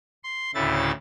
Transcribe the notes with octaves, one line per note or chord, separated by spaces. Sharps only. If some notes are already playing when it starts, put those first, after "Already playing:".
C6
D2 A2 C#3 A3 E4 A6